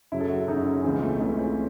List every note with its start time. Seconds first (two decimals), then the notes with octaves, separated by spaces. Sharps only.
0.12 F#2 C#3 F#3 E4
0.20 A4
0.30 F#4
0.48 F#2 C#3 F#3 D#4
0.66 C#4
0.84 C#2 C#3 E3 C4
1.02 A3
1.20 C#2 C#3 E3 A3
1.29 C#4
1.39 C4